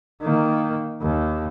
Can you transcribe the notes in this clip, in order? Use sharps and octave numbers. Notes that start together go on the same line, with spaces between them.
D#3 A#3
D#2